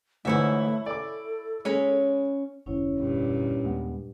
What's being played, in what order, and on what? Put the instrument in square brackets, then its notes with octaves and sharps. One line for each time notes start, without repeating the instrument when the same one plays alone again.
[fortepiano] D2 G#2 E3 [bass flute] A3 [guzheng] E4 C#5 E5
[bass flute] A4 [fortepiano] D5 D6
[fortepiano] G#3 [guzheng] C#4 C#5 B5
[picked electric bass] F1 D2 [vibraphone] C#4 E4 C#5
[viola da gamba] G2 A#2
[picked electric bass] D#2 G#3 B3